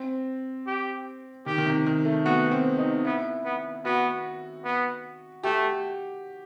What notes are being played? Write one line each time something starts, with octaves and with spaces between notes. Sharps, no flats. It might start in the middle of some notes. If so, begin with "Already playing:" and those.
Already playing: C4
G4
D#3 G4
D#3
C3
D#3
A3
B3 F#4
C4
D#4
B3 E4
B3
B3 F#4
B3
A3 G4